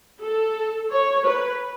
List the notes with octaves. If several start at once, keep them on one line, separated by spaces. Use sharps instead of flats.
A4
C#5
B4